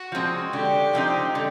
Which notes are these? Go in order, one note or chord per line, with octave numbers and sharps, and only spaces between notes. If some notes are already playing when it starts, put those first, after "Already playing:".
Already playing: F#4
F3 G#3 C4
D3 G4
F3 G#3 C4 D#4
D3